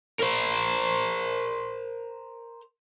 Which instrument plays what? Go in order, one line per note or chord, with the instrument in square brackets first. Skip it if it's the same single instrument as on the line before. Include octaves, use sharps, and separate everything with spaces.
[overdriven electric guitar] A#4 C5